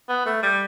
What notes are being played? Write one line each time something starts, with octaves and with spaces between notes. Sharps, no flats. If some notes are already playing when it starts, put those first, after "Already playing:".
B3
A3
G3